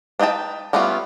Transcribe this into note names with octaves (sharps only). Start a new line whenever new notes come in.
D4 D#4 B4 G5 A5
G3 A3 B3 C#4 F4